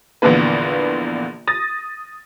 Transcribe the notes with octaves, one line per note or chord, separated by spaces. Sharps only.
A#1 E2 D3 E3 A#3 B4
D#6 A6 A#6